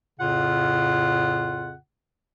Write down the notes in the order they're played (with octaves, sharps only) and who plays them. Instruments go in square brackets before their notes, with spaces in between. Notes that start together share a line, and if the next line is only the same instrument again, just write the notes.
[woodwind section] F2 A2 C#3 F4 F#5